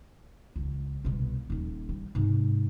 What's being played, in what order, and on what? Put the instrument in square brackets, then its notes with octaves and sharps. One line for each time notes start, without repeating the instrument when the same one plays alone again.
[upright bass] C#2
C2 B2
D#1 D#2
G3
G#2 C3